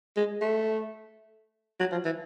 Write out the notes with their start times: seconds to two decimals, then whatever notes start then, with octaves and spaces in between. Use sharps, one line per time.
0.16 G#3
0.41 A3
1.80 F#3
1.92 F3
2.05 E3